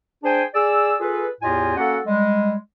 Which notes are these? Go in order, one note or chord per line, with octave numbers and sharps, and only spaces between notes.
D4 G#4 C5 G5 G#5
G#4 D5 E6
F4 G#4 A4 B4
E2 A2 F4 G4 D#5 G#5
A#3 C#4 F#4 A4 F#5
G3 G#3